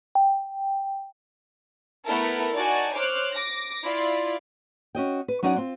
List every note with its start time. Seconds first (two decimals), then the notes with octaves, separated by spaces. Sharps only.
0.15 G5
2.06 A3 B3 E4 A4 A#4
2.54 D#4 F#4 D5 G#5 A5
2.94 C5 C#5 D6 F6 F#6
3.33 D6 A#6
3.84 E4 F4 D5
4.95 C#4 F#4 D#5 G5
5.28 B4
5.43 F#3 C#4 D#4 E4 D5 F#5
5.56 C4 F4